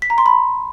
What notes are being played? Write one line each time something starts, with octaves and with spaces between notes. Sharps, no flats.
B6
A#5
C6
B5